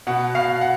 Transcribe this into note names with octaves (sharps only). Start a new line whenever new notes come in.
B2 F#5
B2 F5
F#5